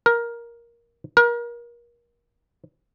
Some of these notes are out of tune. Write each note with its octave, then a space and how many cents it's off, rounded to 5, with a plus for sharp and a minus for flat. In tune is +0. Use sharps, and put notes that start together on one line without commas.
A#4 +10
A#4 +30